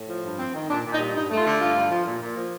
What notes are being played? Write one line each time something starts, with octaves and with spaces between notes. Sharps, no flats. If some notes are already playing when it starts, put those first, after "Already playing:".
Already playing: A2
F3
G2
C4
D#3
A#2 D4
A#2
D#4
G3
G2 D#4
A3
F4
D3
G2 F4
G2
F3
A#2
A#2
F3